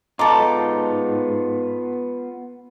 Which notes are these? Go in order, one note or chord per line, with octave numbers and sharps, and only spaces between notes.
G#2 B3 D#4 F4 A4 D6